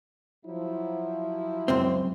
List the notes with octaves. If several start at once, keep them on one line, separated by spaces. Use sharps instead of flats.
F3 F#3 E4
C#2 F#2 C4